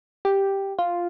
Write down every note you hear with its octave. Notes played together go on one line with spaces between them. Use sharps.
G4
F4